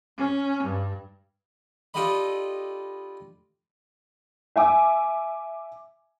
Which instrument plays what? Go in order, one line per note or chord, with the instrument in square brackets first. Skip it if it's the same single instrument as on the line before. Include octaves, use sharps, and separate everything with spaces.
[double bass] C#4
G2
[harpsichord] D4 F4 G4 A4 D#5 B5
[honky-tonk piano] E5 G#5 D6 E6